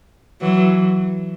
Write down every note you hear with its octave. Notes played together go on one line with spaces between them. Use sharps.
E3 F#3